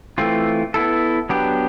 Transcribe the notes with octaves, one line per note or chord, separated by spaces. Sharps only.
E3 A3 C4 F4
B3 E4 A4
F#3 B3 D4 G4